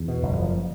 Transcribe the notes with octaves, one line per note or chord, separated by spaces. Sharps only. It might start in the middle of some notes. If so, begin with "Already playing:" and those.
Already playing: E2
B2
F#1
F3